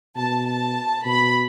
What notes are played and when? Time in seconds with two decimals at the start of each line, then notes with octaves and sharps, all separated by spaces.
0.17 B2 A5
0.46 A5
1.05 B2 B5